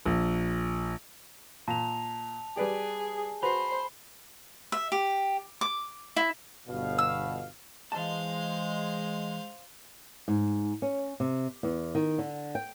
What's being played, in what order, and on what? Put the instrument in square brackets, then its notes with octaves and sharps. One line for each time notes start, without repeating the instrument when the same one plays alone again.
[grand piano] A#1
[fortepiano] A#2 [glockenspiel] A5 F7
[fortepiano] G3 B4 D5 [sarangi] G#4
[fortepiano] F#4 B4 [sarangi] C5 [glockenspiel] B5
[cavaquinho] E5
G4
D6
E4
[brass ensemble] G1 B2 F5
[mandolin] E6
[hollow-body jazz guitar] E3 A5 [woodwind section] G#3 [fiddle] C5 F5
[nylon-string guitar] G#2
C#4
C3
E2
D#3
D3
G5